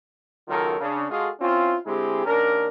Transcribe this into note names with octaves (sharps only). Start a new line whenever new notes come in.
C#2 D#3 F#3 F4 A4 A#4
C#3 D4
G#3 F4 F#4 G#4 A4
C4 C#4 E4 F4
D3 G#3 C4 E4 G4 G#4
D#2 C#4 D4 A#4